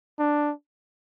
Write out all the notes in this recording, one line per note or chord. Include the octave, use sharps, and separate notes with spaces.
D4